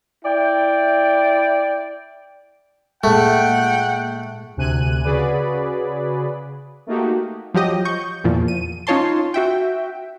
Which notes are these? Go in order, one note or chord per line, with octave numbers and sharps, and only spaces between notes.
E4 D5 G5
A#2 G#3 A3 F#5 G5
D2 C3 G#5 F#6 D#7
C#3 F#4 G#4 B4 D5 B5
A3 A#3 D#4 F#4 G4
F3 F#3 G4 D#5
C#6 G6
E2 A#2 F3
D#7
C#4 D#4 F4 C#5 A5 C6
F#4 E5 G5